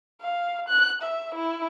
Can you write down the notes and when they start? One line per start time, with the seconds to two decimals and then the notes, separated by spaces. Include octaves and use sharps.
0.21 F5
0.68 F#6
1.02 E5
1.35 E4